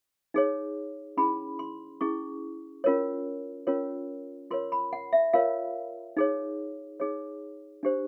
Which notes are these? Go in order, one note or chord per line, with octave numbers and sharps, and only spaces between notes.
D#4 G#4 C#5
C#4 E4 G#4 B5
C6
C#4 E4 G#4 C#6
C#4 F4 A#4 C#5
C#4 F4 A#4 C#5
F4 A#4 C#5 C6
B5
F#5
E5
F4 A#4 C#5 F5
D#4 G#4 C#5
D#4 G#4 C#5
D4 G4 C5